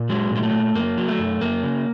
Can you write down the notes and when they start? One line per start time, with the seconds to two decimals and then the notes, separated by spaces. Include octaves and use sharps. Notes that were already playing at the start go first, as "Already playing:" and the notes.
Already playing: A#2
0.09 F#3 G#3
0.31 A#2 G#3
0.43 A3
0.53 A#2
0.75 F#2 A#3
0.97 F#3
1.08 A3
1.19 F#2
1.41 F#2 A#3
1.63 C#3